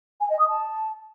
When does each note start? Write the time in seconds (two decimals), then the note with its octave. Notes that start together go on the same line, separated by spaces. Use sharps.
0.20 G#5
0.30 D#5
0.39 D#6
0.48 A5